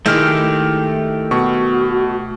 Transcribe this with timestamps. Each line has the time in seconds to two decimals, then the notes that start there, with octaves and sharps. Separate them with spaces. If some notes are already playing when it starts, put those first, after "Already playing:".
0.06 D#3 G#3 A3 E4 G4 F6 G6
1.31 B2 F#4 C#6